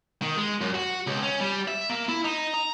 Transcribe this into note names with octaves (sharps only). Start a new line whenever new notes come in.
D#3
G#3
F#2
F#4
C#2
C#4
G3
E5
A#3
E4
D#4
A#5